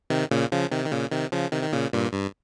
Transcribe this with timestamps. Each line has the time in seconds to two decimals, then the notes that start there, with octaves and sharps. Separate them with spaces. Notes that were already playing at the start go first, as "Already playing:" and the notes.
0.10 C3 D#3
0.31 A#2 C#3
0.52 C#3 F3
0.72 C3 D#3
0.86 D#3
0.92 A#2 C#3
1.11 C3 D#3
1.32 C#3 F3
1.52 C3 D#3
1.63 D#3
1.73 A#2 C#3
1.93 G2 A#2
2.13 G2